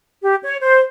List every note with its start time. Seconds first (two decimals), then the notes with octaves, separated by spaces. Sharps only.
0.22 G4
0.44 C#5
0.61 C5